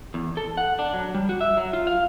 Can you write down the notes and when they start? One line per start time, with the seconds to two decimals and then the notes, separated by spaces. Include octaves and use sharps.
0.14 E2
0.37 A4
0.57 F#5
0.79 D4
0.94 F#3
1.15 G3
1.29 F#4
1.41 E5
1.57 F#3
1.73 F4
1.87 F5